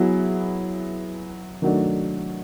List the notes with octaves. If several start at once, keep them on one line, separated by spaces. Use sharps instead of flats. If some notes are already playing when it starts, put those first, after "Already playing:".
Already playing: F#3 B3 E4 G#4
D#3 F#3 A3 D4